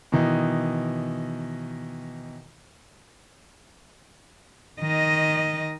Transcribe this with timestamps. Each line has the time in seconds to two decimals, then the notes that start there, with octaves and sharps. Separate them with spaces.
0.12 B2 D#3 E3 D#4
4.81 D#3 D#5